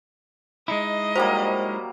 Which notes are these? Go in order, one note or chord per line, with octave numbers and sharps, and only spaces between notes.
G#3 D#4 E4 D#5
F#3 G3 A#3 C5